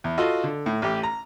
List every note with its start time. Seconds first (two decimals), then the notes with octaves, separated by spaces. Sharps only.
0.04 E2
0.18 F4 F#4 A4 D#5 F5 C6
0.44 D3
0.66 A2
0.82 A1 G4
1.03 A#5